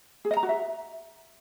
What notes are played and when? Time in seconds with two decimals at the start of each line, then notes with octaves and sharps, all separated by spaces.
0.25 G#4
0.31 D#5
0.37 A#5
0.43 F#4
0.49 E5